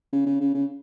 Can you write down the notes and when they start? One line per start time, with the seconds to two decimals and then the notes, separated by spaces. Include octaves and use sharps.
0.13 C#3
0.26 C#3
0.41 C#3
0.55 C#3